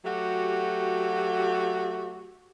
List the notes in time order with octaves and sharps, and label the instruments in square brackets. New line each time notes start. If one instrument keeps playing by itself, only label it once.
[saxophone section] F#3 A3 F#4 G4